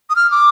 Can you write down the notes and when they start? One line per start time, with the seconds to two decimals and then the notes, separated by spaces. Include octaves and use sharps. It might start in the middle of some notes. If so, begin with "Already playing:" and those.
0.10 D#6
0.16 F6
0.31 D6